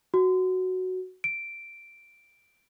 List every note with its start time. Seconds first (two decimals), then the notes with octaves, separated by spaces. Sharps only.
0.14 F#4
1.24 D7